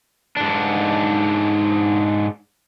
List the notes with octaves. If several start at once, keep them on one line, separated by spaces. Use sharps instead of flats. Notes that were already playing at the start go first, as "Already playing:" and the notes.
G#2 D4